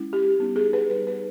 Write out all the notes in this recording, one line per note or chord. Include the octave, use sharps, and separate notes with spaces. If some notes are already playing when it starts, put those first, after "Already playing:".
Already playing: G#3 C#4 E4
G4
G3 B3 D#4
G#4
B4
G3 B3 D#4 B4
B4